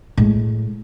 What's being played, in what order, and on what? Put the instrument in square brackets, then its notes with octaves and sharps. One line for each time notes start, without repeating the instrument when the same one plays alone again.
[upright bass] A2 G#3